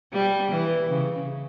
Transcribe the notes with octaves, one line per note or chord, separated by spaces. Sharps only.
G3
E3
C#3